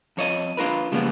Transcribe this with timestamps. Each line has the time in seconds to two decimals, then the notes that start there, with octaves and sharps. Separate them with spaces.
0.17 F2 C#5 D#5
0.57 D4 F4 A#4 B4
0.92 C#3 F3 G3 G#3 A#3 B3